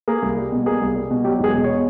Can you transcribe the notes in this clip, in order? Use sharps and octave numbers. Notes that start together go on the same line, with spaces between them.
A#3 G#4
C2
G3
B2
A#3 G#4
C2
G3
B2
F#3 G4
E1 G#4
B2
C#5